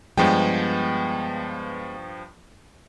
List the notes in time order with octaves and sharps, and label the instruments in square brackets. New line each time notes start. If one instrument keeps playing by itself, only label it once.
[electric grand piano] G2 F3 G5 [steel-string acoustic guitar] G#3 B3